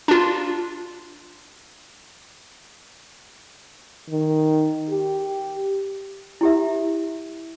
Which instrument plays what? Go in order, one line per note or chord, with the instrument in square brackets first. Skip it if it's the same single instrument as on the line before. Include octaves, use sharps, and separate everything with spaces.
[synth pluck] D4 F4
[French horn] D#3
G4
[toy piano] E4 G4 E5